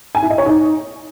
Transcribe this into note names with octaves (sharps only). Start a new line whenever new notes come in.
G#5
E4
D#5
C#5
D#4